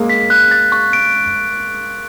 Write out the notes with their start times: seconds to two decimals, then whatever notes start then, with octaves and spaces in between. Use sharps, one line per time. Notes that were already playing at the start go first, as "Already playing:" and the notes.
Already playing: G#3 A#3
0.10 B6
0.30 F#6
0.51 A6
0.72 C#6
0.93 D7